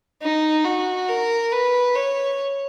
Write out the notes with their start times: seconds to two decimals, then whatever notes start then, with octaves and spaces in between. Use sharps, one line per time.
0.22 D#4
0.65 F#4
1.09 A#4
1.52 B4
1.96 C#5